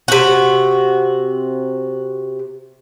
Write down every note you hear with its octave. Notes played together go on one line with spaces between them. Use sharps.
C3 F#4